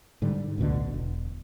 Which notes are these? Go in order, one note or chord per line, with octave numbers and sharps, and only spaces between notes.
G#2 D3 G3
A1 D2 B2 D3
E1